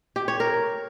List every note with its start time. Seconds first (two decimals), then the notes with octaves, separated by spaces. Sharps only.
0.16 G4
0.28 C#5
0.40 A#4